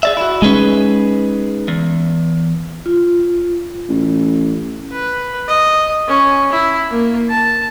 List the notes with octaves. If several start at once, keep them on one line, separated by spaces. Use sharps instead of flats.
G#4 D5 E5
E4 F#4
G#3 C#4 D#4 G#4 B4
E2
F4
A1
B4
D#5
C#4
E4
A#3
A5